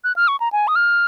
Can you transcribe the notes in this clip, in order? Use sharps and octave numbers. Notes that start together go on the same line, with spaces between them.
F#6
F6
C#6
A#5
G#5
D#6
F6